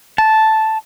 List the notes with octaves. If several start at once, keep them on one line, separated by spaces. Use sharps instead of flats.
A5